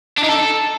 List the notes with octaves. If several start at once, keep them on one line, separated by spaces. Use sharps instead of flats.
D4
D#4
A4